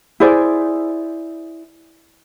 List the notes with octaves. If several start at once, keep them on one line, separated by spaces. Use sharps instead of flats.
E4 G#4 C5 D5